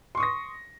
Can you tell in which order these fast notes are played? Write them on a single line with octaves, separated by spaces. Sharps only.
C6 C#6 D#6 A#6